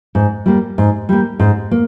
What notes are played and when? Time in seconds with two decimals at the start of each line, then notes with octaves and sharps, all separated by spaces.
0.15 G#2
0.46 G3 A#3
0.78 G#2
1.09 G3 A#3
1.39 G#2
1.71 A#3